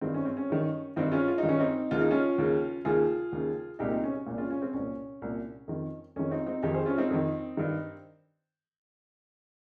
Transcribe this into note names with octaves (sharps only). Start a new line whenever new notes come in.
G2 D#3 C4
C#4
C4
C#4
G2 D#3
G2 D#3 C4 D#4
D#4
C#4 F4
F4
D#4
G2 D#3
C#4
C4 D#4
D#2 C#3 F4
D#4
C#4 F4
D#2 C#3
D#2 C#3 F4 G#4
D#2 C#3
C2 A#2 D#4 G4
C4 D#4
C#4
C#4
C2 A#2
C#4 F4
C#4
C4
C2 C#4
A#2
C2 A#2
F2 D#3
F2 D#3 C#4
C4 D#4
C4 D#4
F2 D#3 D#4 G4
G#4 C5
C#4 F4
C4 D#4
F2 D#3
G2 D#3